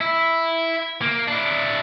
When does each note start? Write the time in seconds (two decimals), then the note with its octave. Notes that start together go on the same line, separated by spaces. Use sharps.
0.01 E4
1.02 A#3
1.28 D4 E4